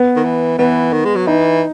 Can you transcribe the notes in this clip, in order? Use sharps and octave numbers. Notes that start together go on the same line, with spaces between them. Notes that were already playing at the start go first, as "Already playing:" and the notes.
Already playing: B3
D#3
E3
E3 B3
D#3
G#3
F#3
E3 D#4